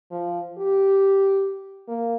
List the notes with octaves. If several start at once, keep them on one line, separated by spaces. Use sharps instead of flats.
F3
G4
A#3